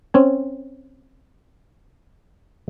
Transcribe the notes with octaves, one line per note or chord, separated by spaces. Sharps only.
C4 C#4 G#5